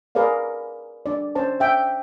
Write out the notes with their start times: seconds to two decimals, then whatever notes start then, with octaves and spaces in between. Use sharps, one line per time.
0.15 G#4 A#4 B4 D5 F5
1.06 D4 D5
1.35 C#4 C5 C#5 A5
1.60 E5 G5